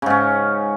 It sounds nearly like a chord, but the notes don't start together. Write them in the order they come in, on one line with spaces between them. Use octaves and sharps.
C#3 G#2 C#4